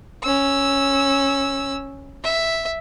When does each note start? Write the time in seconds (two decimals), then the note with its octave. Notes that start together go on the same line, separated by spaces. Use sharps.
0.23 C#4 E6
2.23 E5